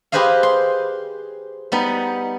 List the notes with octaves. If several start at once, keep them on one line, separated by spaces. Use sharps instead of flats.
G4 G#4 B4 C5 D#5 F5
C6
G3 B3 D#4